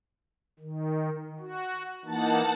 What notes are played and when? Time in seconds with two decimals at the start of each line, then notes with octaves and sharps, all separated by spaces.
0.59 D#3
1.39 F#4
2.05 E3 A#3 D#4 F#5 A5